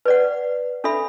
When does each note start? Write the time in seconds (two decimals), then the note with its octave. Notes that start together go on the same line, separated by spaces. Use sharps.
0.05 B4 D5 F#5
0.84 D4 A4 E5 B5